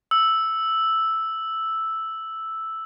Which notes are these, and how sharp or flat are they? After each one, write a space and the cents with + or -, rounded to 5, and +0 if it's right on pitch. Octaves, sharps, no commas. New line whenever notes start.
E6 +0